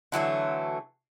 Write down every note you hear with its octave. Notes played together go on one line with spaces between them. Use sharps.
D3 E3 F#3 A3